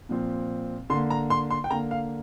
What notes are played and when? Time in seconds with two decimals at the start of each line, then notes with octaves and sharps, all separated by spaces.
0.09 A#2 F3 C4
0.90 D3 C6
0.94 A#3
1.10 A#5
1.30 C6
1.51 C6
1.64 G5
1.70 D3 A#3 A#5
1.91 F5